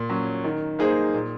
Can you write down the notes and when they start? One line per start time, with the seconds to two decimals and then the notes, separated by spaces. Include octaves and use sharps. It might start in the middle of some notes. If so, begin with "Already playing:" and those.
Already playing: A#2
0.10 F#3 C#4
0.44 D#3
0.79 A#3 D#4 G#4 C5
1.14 A#2